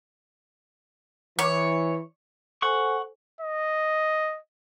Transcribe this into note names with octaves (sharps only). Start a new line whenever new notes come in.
E3 C#5
A4 C5 F#5 G#5 C#6
D#5